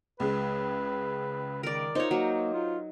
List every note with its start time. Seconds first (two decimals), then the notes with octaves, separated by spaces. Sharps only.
0.20 C#2 C#3 G#3 B4
1.63 D#3 A#4 D5
1.95 D#4 F4 C5 C#5
2.11 F#3 A#3
2.54 F4